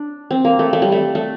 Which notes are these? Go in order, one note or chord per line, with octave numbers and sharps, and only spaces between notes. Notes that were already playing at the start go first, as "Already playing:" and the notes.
Already playing: D4
C4
A#3
A3
A3
G3
A3
A3